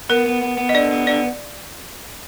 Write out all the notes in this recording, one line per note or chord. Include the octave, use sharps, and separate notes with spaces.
B3 A#4
B3
B3
B3
D#5
D3 D5
B3
D3 D5